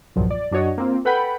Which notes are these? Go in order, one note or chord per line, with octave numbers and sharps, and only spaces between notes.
B1 E2 G2 A#2 F3 F#3
D5
F#2 D4 F#4 C#5 D#5
A#3 C4 F4
A4 B4 F#5 G5 B5 G6